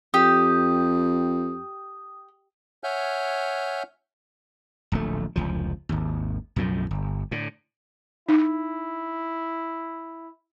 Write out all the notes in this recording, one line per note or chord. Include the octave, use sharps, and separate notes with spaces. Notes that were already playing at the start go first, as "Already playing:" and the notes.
F2 G4 D#6
C#5 E5 F#5 G#5 F6 G6
D1 A#1 B2 A3
F1 C#2 F3
G#1 D#2
B1 F#2 A2 F3
G1
A2 D3
D#4 E4